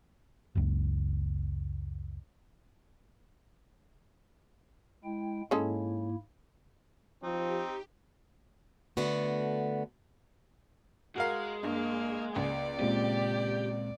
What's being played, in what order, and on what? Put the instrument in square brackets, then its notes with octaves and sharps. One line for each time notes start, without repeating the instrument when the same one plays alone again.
[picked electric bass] F#1 C#2
[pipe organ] G#3 E4 G5
[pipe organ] G#2 A#3 E4 [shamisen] G#3 C#4 A4
[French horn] F3 [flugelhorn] C4 [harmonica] D#4 [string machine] G4
[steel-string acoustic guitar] D3 A3 B3 F#4
[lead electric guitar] G#3 [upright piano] F#4 A#4 F5
[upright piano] G2 [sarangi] A#3
[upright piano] C#2 [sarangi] D5
[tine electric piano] A#2 G#3 C4 [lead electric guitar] G4